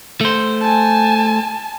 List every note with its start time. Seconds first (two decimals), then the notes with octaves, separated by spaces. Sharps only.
0.21 A3 C5
0.62 G#5 A5